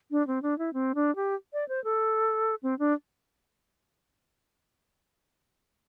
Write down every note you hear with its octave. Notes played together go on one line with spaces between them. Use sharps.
D4
C4
D4
E4
C4
D4
G4
D5
C5
A4
C4
D4